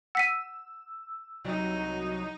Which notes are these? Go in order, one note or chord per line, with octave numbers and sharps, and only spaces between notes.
F#5 E6 B6 D#7
C2 F#3 D#4